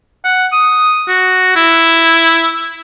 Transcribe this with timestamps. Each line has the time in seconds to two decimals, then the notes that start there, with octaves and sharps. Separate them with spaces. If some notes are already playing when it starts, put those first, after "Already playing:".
0.25 F#5
0.52 D#6
1.08 F#4
1.56 E4